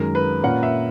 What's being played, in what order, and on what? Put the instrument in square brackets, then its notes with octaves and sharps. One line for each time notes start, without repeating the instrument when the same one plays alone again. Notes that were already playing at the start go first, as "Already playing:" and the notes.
Already playing: [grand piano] F#2 D#3 G#3 [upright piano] A#4
[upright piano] B4
[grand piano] A#2 A#3 C#4 [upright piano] F#5
[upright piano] E5